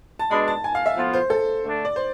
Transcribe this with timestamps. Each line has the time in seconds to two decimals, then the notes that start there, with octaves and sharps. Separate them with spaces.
0.19 A5
0.31 B2 G#3 D4 B5
0.48 A5
0.64 G#5
0.75 F5
0.86 E5
0.97 A2 F3 B3 F4
1.13 C5
1.30 A4
1.63 D3 A3 D4
1.85 D5
1.96 C5